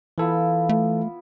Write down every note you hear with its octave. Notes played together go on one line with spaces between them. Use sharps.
E3 B3 E4 F4 A4
A3